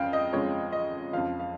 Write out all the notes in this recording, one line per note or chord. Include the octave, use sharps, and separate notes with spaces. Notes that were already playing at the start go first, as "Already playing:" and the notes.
Already playing: F2 C#3 G#3 F5 G5
D#5
F2 C#3 F3 G#3 C#5
D#5
F2 C#3 F3 F5
F5